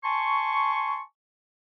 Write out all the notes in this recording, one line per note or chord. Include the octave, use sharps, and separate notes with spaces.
G#5 A5 C6 C#6